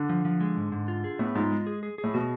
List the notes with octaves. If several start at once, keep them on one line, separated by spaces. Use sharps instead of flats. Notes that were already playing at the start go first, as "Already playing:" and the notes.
Already playing: D3
F3
F3
G#3
G#2
G#2
F4
G#4
A2 B3
G#2 F4
G#3
G#4
G#4
G#4
A2
B2 F#4